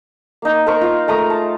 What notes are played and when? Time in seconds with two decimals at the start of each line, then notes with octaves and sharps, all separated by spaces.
0.42 A#3 D#4
0.67 A#4 C5 A#5 C#6
0.81 F4 F5
1.07 G#3 A3 A#5 D#6
1.30 A5